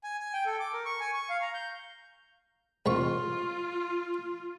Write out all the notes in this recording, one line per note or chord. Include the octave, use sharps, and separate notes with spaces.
G#5
G#5
G5
A4
D6
A#4
C#6
G#5
C#6
F5
A#5
G6
C2 G#2 F4 C#6